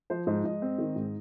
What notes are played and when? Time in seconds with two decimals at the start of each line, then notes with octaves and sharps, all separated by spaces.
0.10 F3 C5
0.27 G#2 C5
0.45 G#2 D#5
0.62 C4
0.78 D#3
0.96 G#2